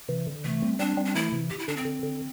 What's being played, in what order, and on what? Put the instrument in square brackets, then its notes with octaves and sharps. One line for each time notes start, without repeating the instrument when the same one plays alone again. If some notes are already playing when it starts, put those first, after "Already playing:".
[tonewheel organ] C3 E3
D3
[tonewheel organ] C3 E3 [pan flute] A3
[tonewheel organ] G3 C4
[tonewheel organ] G3 C4 [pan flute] D4
[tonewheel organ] G3 C4
[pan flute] D4
[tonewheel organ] E3 A3 [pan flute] E4
[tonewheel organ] C3 E3
[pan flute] G4
E4
[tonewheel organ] D3 [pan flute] D4
[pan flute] C4
[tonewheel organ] D3
D3